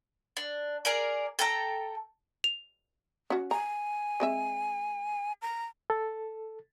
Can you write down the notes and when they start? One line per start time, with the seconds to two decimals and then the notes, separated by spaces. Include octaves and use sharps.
0.37 D4
0.85 G#4 A#4 D5
1.39 A4 G5 A5 A#5
2.44 F7
3.30 C#4 F#4
3.51 G#5 A#5
4.20 G#3 C4 E5
5.42 A#5
5.90 A4